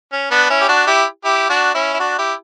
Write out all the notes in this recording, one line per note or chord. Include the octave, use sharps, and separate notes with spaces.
C#4
B3 D4
C#4 E4
G4
D4 F#4
E4 G4
E4 G4
D4 F#4
C#4 E4
E4
D4 F#4
E4 G4